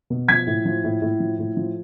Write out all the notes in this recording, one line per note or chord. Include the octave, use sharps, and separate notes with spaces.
B2
F3 G#6 B6
A2
F3
A2
A2
F3
A2
F3